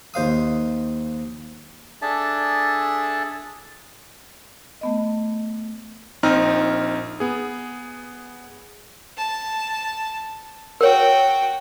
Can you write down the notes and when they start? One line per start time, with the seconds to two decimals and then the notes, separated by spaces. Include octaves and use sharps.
0.14 D#2 C5 F5 D#6
2.02 D4 G#4 A4 D5 E5 A5
4.81 A3 B3 D#5
6.23 A#1 C4 D#4 A#5 F6
7.20 B3 G#4
9.17 A5
10.81 F#4 A#4 C#5 G5